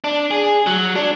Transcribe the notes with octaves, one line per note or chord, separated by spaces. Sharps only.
D4
G#4
F#3
D4